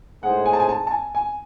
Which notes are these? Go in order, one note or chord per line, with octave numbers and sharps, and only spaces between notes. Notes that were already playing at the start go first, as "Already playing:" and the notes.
A2 G#3 D#4 G#4 C5 F#5
G#5
A5
G#5
A5
A5
G#5
G#5